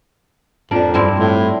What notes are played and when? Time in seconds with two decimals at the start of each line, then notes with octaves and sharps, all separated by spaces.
0.71 F2 F3 A#3 D4
0.94 G2 C4 E4
1.19 A2